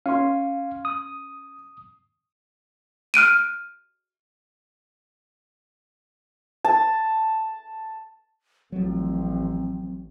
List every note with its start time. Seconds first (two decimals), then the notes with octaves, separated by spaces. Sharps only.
0.06 C#4 F5 C6
0.85 D#6
3.14 F6 F#6 D7 D#7
6.64 A5
8.72 A1 F3 F#3 C4